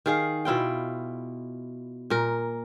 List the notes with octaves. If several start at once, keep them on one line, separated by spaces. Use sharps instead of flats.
D#3 G#4 F5
B2 E4 F4 G5
A#2 A#4